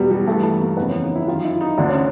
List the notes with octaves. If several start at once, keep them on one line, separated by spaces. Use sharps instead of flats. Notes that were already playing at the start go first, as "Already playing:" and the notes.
Already playing: E2 B2 G3
G3
G2 E3 A3
A3
A#3
F2 C#3 E3 B3
C#4
D#4
E4
F#2 D#3 F4
E4
D#4
D2 D3 D4
C#4